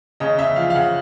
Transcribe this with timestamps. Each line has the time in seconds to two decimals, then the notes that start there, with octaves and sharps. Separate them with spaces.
0.20 C#3 D#5
0.38 C#3 E5
0.56 F3 F5
0.70 F5
0.75 C#3 F#5